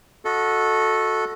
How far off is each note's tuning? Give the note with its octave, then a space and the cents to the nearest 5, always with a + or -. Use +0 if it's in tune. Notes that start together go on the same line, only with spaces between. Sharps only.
F#4 -20 A4 +0 D#5 +20